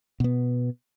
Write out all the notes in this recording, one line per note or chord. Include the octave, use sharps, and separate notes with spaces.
B2 B3